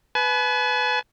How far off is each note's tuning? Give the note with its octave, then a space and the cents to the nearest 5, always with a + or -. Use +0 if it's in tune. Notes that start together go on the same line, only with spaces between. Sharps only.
B4 +5 G#5 +45